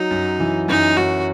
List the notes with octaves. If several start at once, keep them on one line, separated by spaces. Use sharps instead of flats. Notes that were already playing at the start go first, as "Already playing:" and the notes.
Already playing: F#3 D#4
F#2
E3
F#2 D#4
F#2 F#4